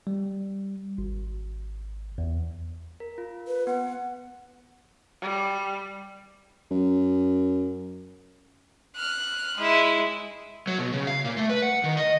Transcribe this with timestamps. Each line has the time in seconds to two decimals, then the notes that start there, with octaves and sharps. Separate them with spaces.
0.07 G3
0.98 G#1
2.18 E2
3.00 A#4
3.18 F4
3.47 B4
3.67 B3 F#5
5.21 G3
6.71 F#2
8.96 F6 F#6
9.57 G#3 E4
10.67 F#3
10.78 B2
10.92 C#3
11.07 F5
11.24 A#2
11.37 A3
11.50 B4
11.62 F#5
11.84 D#3
11.97 D#5